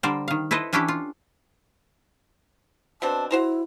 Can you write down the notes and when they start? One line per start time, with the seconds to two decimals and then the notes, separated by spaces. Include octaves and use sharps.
0.03 D3 G3 A#4 C5 D5
0.28 D#3 F5
0.51 E4 A4 B4 C5 D#5
0.73 E3 C#4 D4 E4 G4 A4
0.88 F4
3.02 B2 C4 D4 A5
3.31 E4 F#4 C5 A#5